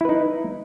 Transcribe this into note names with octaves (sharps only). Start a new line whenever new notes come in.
D#4 E4 B4